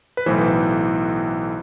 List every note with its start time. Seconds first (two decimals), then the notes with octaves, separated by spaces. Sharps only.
0.17 B4
0.26 B1 A2 E3 C5